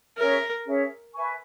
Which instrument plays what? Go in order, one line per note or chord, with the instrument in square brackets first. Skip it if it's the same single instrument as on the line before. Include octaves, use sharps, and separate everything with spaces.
[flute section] C#4 G#4 C#5 E5 [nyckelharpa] A#4
[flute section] C#4 G#4 C#5 E5
B4 E5 G#5 C#6